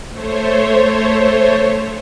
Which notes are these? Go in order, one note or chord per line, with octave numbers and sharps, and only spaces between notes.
A3 C5 C#5